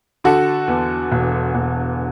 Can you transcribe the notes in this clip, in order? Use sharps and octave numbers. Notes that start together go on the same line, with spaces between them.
D3 F#4 A4
E2
E1
E1